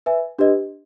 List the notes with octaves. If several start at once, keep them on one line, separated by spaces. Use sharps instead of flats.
B4 E5 G#5
D4 G4 B4 D#5